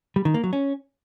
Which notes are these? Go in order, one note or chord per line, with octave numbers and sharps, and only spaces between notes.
G3
D#3
A#3
F#3
C#4